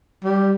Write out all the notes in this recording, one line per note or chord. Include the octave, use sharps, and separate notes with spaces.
G3